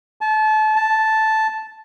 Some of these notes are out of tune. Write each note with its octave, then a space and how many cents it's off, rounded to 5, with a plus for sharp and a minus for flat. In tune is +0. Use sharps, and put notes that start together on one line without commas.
A5 -30
A5 -5